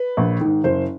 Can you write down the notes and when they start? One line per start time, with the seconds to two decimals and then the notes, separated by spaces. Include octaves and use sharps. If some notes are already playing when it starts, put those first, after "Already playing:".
Already playing: B4
0.17 A#1
0.41 G#2 D#3
0.64 F#1 C5